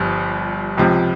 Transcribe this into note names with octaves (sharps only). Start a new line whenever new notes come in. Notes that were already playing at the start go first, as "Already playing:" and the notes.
Already playing: G1 G2 F3
C#2 C3 F3